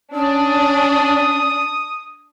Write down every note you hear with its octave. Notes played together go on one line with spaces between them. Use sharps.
C#4 D4 D#6